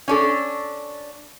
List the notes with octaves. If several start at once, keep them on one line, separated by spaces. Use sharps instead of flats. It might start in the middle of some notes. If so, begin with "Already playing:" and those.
C#4 D4 A4